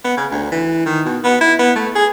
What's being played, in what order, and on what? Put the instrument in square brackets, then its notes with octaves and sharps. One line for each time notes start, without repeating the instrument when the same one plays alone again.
[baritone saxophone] B3
C#3
D2
E3
D#3
B2
B3
E4
B3
A3
G#4